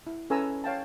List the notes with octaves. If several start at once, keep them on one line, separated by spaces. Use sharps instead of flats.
E4
C#4 A4 B4 G#5 A#5 E6
C#5 F5 G5 A5